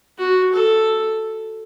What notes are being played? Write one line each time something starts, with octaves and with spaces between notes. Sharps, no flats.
F#4
A4